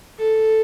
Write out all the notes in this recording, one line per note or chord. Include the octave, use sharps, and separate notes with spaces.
A4